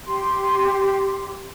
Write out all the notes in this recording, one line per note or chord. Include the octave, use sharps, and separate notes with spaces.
G4 C6